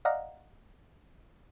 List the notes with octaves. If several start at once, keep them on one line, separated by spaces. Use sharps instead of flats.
D5 D#5 F5 F#5 A#5